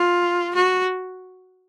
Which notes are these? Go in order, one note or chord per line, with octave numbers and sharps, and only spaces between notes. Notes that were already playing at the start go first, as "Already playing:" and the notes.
Already playing: F4
F#4